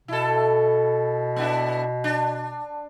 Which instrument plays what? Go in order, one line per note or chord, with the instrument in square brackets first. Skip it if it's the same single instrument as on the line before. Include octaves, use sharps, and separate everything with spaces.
[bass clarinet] B2 [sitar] E4 A4
[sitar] B3 D4 E4
D4